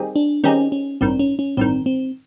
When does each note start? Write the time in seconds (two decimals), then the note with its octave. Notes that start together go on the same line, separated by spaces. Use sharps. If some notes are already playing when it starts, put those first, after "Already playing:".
Already playing: D#3 G3 C4 D#4 G#4
0.16 D4
0.44 D#3 G3 C4 C#4 D#4 G#4
0.72 C#4
1.01 A1 G2 D#3 C4
1.19 C#4
1.39 C#4
1.57 A1 G2 D#3 C4
1.86 C4